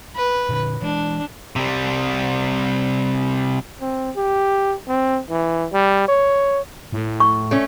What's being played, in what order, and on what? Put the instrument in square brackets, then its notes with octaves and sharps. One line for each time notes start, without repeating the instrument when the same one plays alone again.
[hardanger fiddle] B4
[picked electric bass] A#2 D3
[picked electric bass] E3 G#3 [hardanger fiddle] D4
[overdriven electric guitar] C3 G3
[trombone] C4
G4
C4
E3
G3
C#5
[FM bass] A2
[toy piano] C#6
[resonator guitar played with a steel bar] A3 C#4